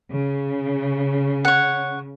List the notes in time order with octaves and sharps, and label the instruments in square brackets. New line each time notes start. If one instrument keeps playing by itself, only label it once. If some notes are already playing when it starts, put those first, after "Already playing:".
[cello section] C#3
[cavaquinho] C#5 F#5